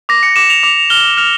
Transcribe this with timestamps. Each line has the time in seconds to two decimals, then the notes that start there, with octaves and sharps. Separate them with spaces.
0.09 D6 A#6
0.23 C#7
0.36 D6 E7
0.50 F7
0.63 D6 F7
0.90 F6 G7
1.17 F6 F7